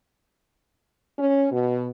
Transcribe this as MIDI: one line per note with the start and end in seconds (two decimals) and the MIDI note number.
1.19 1.47 61
1.52 1.89 47